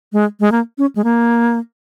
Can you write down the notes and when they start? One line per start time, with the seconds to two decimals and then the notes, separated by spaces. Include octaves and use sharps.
0.13 G#3
0.40 G#3
0.52 A#3
0.78 C#4
0.96 G#3
1.04 A#3